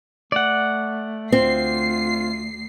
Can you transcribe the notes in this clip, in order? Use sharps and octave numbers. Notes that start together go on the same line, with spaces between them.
A3 D5 F#5
D2 C4 F4 C7